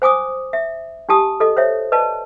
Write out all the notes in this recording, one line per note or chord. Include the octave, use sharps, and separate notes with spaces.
C5 G#5 D6 D#6
E5
D4 G4 A5 D#6
A4 D#5
C5 C#5 E5
B4 D5 D#5 A5